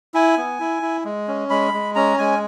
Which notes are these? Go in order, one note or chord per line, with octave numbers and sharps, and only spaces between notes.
E4 G#5
B3
E4
E4
G#3
C#4
G#3 B5
G#3
C#4 A#5
G#3 G#5